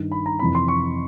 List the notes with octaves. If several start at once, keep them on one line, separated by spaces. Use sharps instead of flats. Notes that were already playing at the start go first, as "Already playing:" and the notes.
Already playing: G2 D#3
B5
A#5
F2 C3 E3 B5
C6
C#6